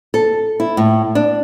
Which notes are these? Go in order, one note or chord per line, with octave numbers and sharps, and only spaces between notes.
A4
E4
A2
D4